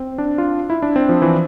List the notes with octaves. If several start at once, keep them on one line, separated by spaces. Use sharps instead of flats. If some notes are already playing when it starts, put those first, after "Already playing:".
Already playing: C4
D4
F4
E4
D4
C4
F3
E3